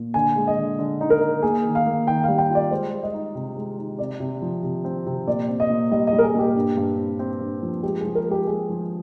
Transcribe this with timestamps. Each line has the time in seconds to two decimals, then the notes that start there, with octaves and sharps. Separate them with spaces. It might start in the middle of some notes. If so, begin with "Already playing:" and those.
Already playing: A#2
0.14 D3 G#5
0.36 G#3
0.47 D#5
0.57 D3
0.79 D3
1.01 D#4
1.10 A#4
1.21 D#4
1.42 A#3 G#4
1.64 D#3
1.75 F5
1.86 A#3
2.07 D#3 G5
2.24 G3 F5
2.38 G5
2.50 F4
2.55 D5
2.71 G#3 C5
2.92 G#3
3.03 D#5
3.14 D#4
3.35 C3
3.57 G#3
3.78 D#4
3.99 C3 D5
4.20 C3
4.42 F3
4.63 C3
4.85 C4
5.07 C3
5.27 A#2 D5
5.48 C4
5.60 D#5
5.70 A#2
5.91 G3 D#5
6.07 D#5
6.13 G3
6.18 A#4
6.23 G#4
6.35 A#2 G4
6.55 G2
6.77 G2
6.98 C4
7.19 C4
7.41 G2
7.62 F3
7.83 G#3 G4
8.00 F3 G#4
8.15 A#4
8.26 G#3
8.31 G4
8.47 G#3 G#4
8.70 F3